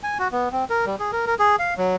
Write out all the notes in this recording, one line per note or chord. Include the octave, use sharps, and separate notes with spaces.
G#5
F#4
B3
C4
A#4
G3
G#4
A#4
A#4
G#4
F5
F#3